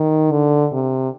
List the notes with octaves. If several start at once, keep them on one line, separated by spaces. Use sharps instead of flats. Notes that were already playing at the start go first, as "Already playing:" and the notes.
Already playing: D#3
D3
C3